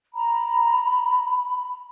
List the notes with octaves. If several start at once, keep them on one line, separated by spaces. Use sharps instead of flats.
A#5 B5